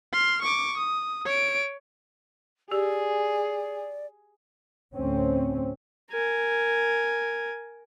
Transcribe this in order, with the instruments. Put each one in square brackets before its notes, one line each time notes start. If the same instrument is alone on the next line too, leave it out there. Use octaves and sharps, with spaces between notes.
[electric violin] C6 F6
C#6 D6
D#6
C#5 D7
[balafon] G4 [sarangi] G#4 [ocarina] D5
[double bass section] D2 A2 C4 C#4
[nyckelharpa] A#4 G#5